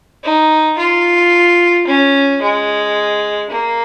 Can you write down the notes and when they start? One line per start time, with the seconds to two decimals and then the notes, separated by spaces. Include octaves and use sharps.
0.24 D#4
0.78 F4
1.88 C#4
2.42 G#3
3.50 A#3